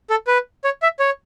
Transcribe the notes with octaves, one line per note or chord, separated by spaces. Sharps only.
A4
B4
C#5
E5
C#5